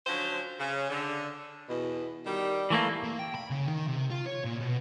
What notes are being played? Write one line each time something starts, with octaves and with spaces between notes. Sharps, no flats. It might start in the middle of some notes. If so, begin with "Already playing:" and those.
D3 F3 F#3 C#4 C5
C#3
D3
E2 B2
D#3 G3
E3 A3 A#3 E4
A#3
G5
B5
C#3
D#3
C3
F4
C#5
A#2
B2